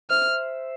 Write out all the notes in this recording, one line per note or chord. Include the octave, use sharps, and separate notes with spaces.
C5 E5 F6